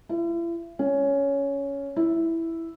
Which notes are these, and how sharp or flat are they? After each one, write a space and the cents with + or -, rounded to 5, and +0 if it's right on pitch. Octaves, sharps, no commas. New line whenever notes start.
E4 +40
C#4 +10
E4 +0